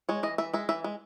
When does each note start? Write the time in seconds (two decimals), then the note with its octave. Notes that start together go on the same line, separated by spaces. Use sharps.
0.09 G#3 C#5
0.23 E3 D#5
0.38 E3 E5
0.53 G#3 E5
0.69 E3 E5
0.84 G#3